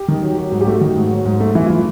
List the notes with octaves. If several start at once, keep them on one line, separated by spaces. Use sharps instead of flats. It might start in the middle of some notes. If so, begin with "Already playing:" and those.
Already playing: G4
D#3
F#3
F#3
G#2
G4
A3 F#4
D#3
G#2
F#3
G#2
A3
E3 E4
E3 F4